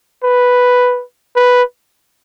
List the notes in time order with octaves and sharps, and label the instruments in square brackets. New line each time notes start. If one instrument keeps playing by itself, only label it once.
[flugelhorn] B4
B4